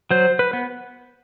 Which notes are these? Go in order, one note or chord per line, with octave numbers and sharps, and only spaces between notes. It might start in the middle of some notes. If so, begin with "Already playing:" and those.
F#3 C5
B4
B3